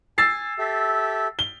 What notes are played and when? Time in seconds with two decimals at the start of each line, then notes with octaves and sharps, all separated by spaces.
0.18 G#5 E6 A6 C7
0.59 G4 A4 E5
1.39 G7